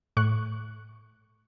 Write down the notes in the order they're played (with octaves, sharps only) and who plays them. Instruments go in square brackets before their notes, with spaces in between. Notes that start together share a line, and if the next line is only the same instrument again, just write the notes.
[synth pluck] A2 C#6 F#6